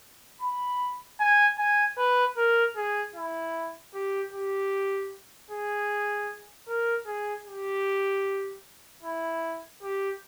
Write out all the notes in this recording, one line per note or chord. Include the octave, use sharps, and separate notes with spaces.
B5
G#5
G#5
B4
A#4
G#4
E4
G4
G4
G#4
A#4
G#4
G4
E4
G4